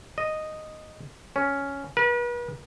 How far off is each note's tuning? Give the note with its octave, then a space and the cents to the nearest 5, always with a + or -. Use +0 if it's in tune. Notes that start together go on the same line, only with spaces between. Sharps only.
D#5 -5
C#4 +5
B4 -40